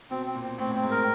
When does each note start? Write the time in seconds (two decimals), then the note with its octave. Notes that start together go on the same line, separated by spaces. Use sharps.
0.11 B2 C4
0.26 C4
0.35 A#2
0.44 C4
0.58 A2 C4
0.71 A2 C4
0.83 G#2
0.91 A#4